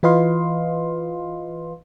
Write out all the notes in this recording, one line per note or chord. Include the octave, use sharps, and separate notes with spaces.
E3 F4 B4 D#5 F5 C6